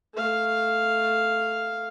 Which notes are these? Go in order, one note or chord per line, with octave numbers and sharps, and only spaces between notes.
A3 F5